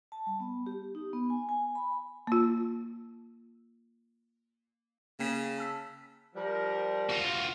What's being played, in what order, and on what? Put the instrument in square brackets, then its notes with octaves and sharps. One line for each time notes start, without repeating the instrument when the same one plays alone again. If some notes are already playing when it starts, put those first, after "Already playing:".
[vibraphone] A5
G3
B3
G4
D#4
B3
G#5
G#5
B5
[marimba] A#3 F4
[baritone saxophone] C#3 [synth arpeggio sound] A#3 G5 B6
[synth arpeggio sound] A5 E6 B6
[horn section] F3 G3 A#4
[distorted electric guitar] F4 F#4